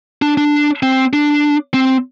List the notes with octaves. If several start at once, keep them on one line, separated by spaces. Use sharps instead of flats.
D4
D4
C4
D4
C4